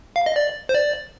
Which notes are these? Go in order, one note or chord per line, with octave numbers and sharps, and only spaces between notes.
F5
D#5
D5
C5
D5